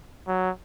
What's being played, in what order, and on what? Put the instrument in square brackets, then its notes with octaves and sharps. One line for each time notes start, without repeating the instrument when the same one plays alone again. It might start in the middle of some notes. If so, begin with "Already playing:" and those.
[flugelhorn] F#3